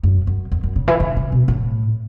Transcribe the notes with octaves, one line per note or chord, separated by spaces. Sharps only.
F#2
F#2
E2
F#2
C#3
E3
D3
C#3
B2
A2